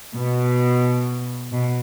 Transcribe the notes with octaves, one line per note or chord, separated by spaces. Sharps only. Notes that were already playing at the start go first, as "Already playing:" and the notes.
B2
B2